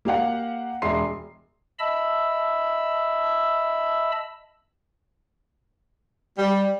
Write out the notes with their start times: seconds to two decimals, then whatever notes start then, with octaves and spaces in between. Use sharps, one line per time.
0.05 A#3 G4 F5 F#5
0.82 E1 G#3 E5 C6 C7
1.79 D#5 E5 A5 B5 E6
6.39 G3